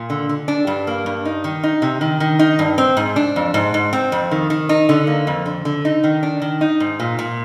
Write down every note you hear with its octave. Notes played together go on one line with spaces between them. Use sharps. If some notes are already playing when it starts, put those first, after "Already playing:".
Already playing: A#2
D3
D3
D4
G2
A#3
G2
D#4
D#3
D#4
C3
D#3
D#3
D#4
G2
C4
G#2
D4
F2
G#2
G#2
C4
F2
D#3
D#3
D#4
D3
A#3
F2
D3
D3
D#4
D#3
D4
D#3
D#4
G#2
A#2
A#2